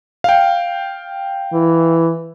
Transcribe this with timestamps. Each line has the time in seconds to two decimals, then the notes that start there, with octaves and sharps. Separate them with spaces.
0.24 F5 G5
1.53 E3